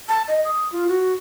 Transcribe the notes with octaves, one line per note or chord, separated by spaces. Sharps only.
A5
D#5
D#6
F4
F#4